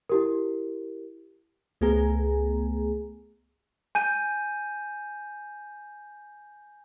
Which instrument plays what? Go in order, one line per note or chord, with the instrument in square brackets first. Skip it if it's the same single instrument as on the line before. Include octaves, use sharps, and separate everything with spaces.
[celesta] E4 G4 A#4
[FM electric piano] C#2 A3 B3 G#4 G#5 A#5
[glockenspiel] G#5 G6 D#7